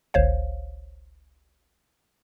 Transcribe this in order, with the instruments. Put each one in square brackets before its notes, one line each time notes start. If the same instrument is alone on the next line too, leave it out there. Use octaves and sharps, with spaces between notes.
[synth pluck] G1 C#2 C5 C#5 F5